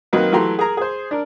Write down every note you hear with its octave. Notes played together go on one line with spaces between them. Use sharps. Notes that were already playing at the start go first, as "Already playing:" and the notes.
D#3 F#3 A#3 C4 D#4 B4
E3 F#3 A3 G4 A#5 C6
G#4 A#4 A#5
G#4 C5
D4 A#4